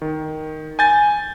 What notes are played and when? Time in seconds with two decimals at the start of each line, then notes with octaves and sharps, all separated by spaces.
0.02 D#3
0.79 G#5 G6 A6